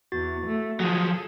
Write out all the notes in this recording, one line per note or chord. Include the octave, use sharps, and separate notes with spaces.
E2 F#4 A6
A3
F3 F#3 G#4 A4